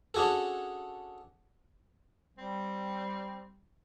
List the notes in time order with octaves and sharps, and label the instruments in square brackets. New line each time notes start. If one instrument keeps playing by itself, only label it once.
[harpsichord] C#4 D4 F#4 G#4 A4
[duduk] G3 [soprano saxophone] C4